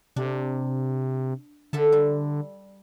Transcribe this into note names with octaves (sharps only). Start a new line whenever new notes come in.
C3 D4
D3 A4 E5 A5
G3